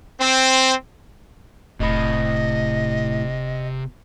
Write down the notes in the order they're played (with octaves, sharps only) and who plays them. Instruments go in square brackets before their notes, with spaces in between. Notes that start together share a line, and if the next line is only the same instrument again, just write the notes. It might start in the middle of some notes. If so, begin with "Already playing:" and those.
[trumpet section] C4
[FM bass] E1 [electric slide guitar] A2 [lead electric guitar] C3 B5 [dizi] D#5